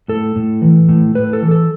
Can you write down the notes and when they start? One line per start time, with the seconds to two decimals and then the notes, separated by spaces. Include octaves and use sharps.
0.08 A2 A4
0.36 A2
0.62 E3
0.89 A2
1.15 A2 B4
1.33 A4
1.42 E3
1.51 A4